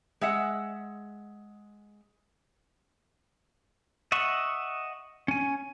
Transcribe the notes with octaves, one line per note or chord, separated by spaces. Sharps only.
G#3 E5 F#5
D#5 E5 F#5 C#6
C#4 G#5